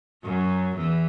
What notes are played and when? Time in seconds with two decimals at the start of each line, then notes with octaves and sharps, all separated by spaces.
0.23 F#2 F#3
0.76 E2 E3